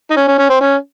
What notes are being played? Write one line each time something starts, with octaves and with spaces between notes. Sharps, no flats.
D#4
C#4
C#4
C#4
C4
C#4